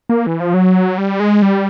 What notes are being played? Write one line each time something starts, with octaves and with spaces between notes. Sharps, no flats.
A#3
E3
F3
F#3
G3
G#3
G3